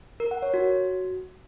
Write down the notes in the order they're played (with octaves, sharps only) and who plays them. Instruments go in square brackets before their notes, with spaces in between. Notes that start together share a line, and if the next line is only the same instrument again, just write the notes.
[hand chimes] A#4
F#5
C#5
F#4